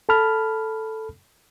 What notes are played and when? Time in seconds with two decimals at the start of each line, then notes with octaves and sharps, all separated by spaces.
0.09 A4 A5 B5 F6